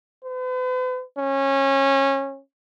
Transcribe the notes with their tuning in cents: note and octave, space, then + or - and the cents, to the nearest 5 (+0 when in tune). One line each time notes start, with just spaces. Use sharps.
B4 +45
C#4 -20